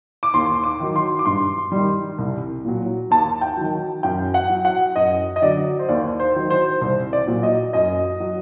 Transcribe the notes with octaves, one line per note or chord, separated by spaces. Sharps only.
D6
D#2 C6
D6
D#3 F#3
C6
D6
G2 C6
D#3 G3
C2
A#2 F#3
D#2 A5
G5
D#3 F#3
F#2 G5
F#5
F#3
F#5
F#2 D#5
D#5
D3 F#3 D5
C5
D#2 D5
C5
D#3 F#3
C5
C2 C5
D5
A#2 F#3
D#5
F#2 D#5
F#3